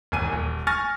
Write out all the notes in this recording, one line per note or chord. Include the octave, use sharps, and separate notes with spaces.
E1 D#2 G#5 D#7
D#1
G#5 C#6 F6 A6 A#6